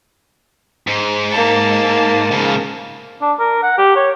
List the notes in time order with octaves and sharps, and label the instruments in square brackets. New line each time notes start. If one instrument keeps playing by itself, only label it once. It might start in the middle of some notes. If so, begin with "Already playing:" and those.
[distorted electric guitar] G#2
[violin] A#3 A5
[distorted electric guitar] G#2 C#3
[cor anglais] D4
A#4
F#5
G4
C#5